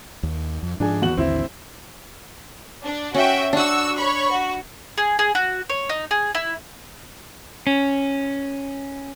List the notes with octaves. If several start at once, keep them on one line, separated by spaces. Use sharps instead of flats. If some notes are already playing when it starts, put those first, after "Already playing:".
D#2
F2
G#2 F3 D4 G#4 G#5
E2 F#4 F#7
A1 D#2 D3 C4 E4 E5
D4
C#4 F#4 E5 G5
D4 F#4 F#5 C#6 E6
C#5 B5 C#6
F#4
G#4
G#4
F#4
C#5
D#4
G#4
E4
C#4